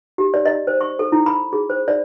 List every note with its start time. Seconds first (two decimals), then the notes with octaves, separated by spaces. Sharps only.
0.18 G4
0.34 D5
0.46 D#5
0.67 C5
0.81 C#6
0.99 A4
1.12 E4
1.26 B5
1.53 G#4
1.70 C5
1.88 D5